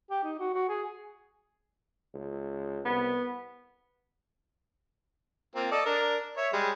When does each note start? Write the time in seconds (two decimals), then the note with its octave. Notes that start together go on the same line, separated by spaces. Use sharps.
0.11 G4
0.24 D#4
0.40 F#4
0.54 F#4
0.69 G#4
2.14 C#2
2.85 C2 B3
5.56 A#3 C4 F4
5.72 A4 D5 D#5
5.86 D4 A#4
6.37 C#5 E5
6.53 G3 G#3